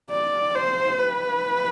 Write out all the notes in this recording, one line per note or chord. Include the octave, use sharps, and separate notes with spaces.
D5
C5
B4